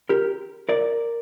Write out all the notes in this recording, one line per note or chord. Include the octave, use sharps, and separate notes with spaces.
G4 A#4
A#4 D5